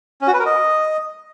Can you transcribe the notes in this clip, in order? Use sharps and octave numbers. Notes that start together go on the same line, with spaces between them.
C#4
F#4
B4
A#4
D#5